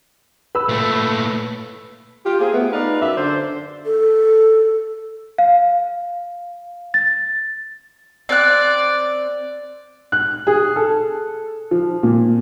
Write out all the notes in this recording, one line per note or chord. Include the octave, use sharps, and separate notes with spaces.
B4 E6
A#2 A3
F4 G4
A#3 C4 G#4
A3 B3
D#4 F4 B4 D5 F5
F#2 D5 E5
D3 D4 C5
A4
F5
A6
C4 D5 F#6
F#6
G#4
A4
F3
A#2